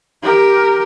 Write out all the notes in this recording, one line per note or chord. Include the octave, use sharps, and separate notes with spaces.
G4 A#4